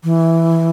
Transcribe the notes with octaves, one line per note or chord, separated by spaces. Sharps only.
E3